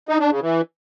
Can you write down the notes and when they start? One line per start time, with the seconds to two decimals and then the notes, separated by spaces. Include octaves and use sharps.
0.09 D#4
0.20 D4
0.31 C#3
0.42 E3